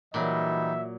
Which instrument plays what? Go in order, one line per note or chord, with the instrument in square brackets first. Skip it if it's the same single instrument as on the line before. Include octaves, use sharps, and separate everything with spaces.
[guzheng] A#2 F#3 [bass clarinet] E3 [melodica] G3 D#4 [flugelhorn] E5